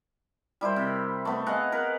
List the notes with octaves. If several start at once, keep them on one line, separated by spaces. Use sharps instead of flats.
G3 E4 A#4 C5
C3
A3 B3
G#4 D#5 F5 F#5
A#4 B4